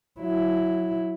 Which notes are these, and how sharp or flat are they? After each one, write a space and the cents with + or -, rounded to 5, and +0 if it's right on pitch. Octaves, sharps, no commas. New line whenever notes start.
F#3 +0 E4 +0